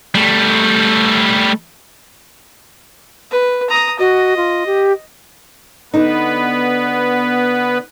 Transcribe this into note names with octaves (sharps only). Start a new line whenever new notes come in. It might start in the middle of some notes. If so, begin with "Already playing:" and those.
G3 A3
B4
A#5 D#6
F#4 D#5
F4
G4
D3 B3 D#4 B4